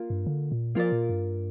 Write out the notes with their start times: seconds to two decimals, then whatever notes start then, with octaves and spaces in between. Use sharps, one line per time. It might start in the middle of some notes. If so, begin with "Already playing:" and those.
Already playing: A#3 F4
0.10 G2
0.26 D3
0.52 A#2
0.75 F3 A#3 F4 A#4 D5
0.92 A#2
1.09 G2